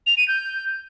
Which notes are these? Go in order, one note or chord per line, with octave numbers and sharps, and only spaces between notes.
F7
D#7
G6